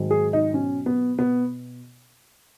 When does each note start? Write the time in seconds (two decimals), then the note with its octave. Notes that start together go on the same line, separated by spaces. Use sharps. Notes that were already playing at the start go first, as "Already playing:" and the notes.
Already playing: G#2 D#3 F#3
0.11 G#4
0.33 D#4
0.54 B2 F#3 C#4
0.86 B3
1.18 B2 B3